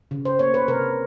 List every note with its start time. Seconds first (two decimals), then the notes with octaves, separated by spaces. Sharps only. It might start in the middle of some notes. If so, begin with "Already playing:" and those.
0.11 C#3
0.25 C5
0.39 A#3 C#5
0.54 B4
0.68 C3 A#4